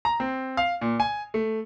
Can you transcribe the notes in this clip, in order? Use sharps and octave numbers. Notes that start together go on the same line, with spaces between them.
A#5
C4
F5
A#2
G#5
A3